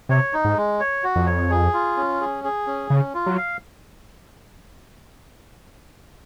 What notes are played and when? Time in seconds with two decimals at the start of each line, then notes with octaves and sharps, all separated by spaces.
0.09 C3 C#5
0.33 D#4
0.44 G#2
0.57 G#3
0.80 C#5
1.03 F#4
1.16 F2
1.27 C#5
1.50 G#4
1.74 F4
1.97 C#4
2.21 G#4
2.44 G#4
2.67 C#4
2.90 C#3 C#4
3.14 F4
3.26 F#3
3.37 F5